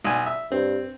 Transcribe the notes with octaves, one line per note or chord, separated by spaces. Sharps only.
B1 G#5
E5
G2 C4